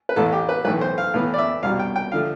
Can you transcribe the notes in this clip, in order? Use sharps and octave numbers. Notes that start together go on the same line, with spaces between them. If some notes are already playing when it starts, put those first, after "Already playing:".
B4
A1 A2 E3 A4
G4
B4
B1 A2 E3 B4
C5
F5
A2 E3 B3 F5
D5
E5
C2 B2 G3 F5
G5
G5
D3 F3 A3 F5